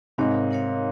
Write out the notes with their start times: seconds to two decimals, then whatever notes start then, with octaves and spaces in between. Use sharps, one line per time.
0.18 G#2 C3 D#4 A#4 C#5 F5
0.51 D#4 A#4 C#5 F5